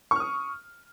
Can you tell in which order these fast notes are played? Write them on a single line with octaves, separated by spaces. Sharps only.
C#6 F6 D#6